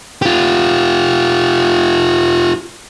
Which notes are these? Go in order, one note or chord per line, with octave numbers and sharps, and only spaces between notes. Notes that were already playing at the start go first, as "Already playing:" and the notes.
F4 G4